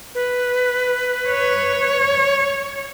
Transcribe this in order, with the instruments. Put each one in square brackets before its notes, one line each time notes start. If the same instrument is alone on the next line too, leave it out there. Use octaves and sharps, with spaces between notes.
[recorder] B4
[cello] C#5